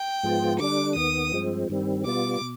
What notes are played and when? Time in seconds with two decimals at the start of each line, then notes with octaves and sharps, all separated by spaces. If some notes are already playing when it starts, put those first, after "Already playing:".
Already playing: G5
0.23 G#2 F3 G#3 B3 F4
0.59 D3 G3 D4 D6
0.96 D#2 D#3 B3 D#6
1.33 G2 F3 G#3 C4
1.69 G2 D#3 G3 C4
2.05 B2 G3 B3 F4 D6
2.41 B2